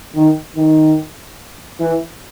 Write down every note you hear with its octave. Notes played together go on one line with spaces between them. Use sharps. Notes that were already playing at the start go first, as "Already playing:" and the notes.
D#3
D#3
E3